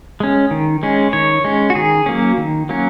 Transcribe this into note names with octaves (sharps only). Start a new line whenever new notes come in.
G#3 C#4
D#3
G#3 C#4
D#3 C#5
G#3 C#4
F#4
D#3 G#4
F#3 A#3 C#4
D#3
F#3 A#3 C#4